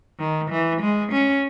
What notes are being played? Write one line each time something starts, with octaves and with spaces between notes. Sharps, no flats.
D#3
E3
G#3
C#4